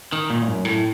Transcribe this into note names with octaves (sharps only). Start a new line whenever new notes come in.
D#3
A#2
A2
F#2
A2